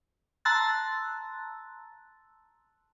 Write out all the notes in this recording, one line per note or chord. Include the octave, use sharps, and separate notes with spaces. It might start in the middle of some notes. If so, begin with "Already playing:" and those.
A5 A#5 C6 E6 F#6 A6